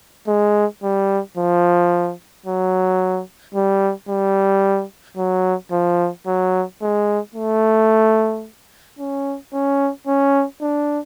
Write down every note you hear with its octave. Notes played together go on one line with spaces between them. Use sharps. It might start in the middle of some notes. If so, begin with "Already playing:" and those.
G#3
G3
F3
F#3
G3
G3
F#3
F3
F#3
G#3
A3
C#4
C#4
C#4
D4